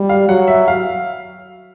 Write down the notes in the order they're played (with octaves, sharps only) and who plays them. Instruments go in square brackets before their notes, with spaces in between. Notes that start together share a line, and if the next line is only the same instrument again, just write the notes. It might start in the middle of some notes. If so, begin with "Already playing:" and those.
Already playing: [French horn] G3
[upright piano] F5
[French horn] F#3 [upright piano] F#5
[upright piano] E5
F5